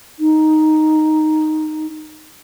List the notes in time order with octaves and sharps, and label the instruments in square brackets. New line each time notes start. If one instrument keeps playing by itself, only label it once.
[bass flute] D#4